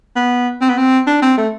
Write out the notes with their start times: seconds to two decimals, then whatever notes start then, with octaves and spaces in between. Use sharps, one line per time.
0.16 B3
0.61 C4
0.69 B3
0.78 C4
1.07 D4
1.22 C4
1.37 A3